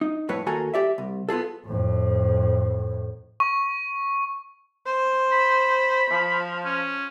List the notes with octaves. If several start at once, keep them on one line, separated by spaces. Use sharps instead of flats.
D#4
F2 A2 B4 C#5
D#2 A#3 F#4 A4 G#5 A#5
G4 D5 E5
C2
B3 F4 G#4 A4
F2 A2
C#6
C5
B5
F3
C#4